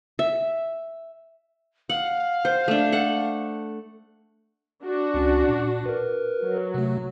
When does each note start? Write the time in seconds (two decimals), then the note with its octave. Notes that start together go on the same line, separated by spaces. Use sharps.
0.19 E5
1.89 F5 F#5
2.45 C5
2.68 A3 D4
2.92 A4 F#5
4.85 D4 F#4
5.14 C#2 C#4
5.49 A#2
5.86 A#4 B4
6.42 F#3
6.74 C3 A3